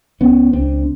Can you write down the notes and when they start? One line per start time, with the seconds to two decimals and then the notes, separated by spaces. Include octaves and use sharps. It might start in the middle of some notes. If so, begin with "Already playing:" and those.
0.20 C#2 B3 C#4
0.53 C#2 C4 D4